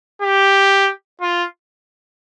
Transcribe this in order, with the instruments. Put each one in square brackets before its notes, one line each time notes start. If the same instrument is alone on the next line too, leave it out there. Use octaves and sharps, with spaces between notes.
[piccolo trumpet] G4
F4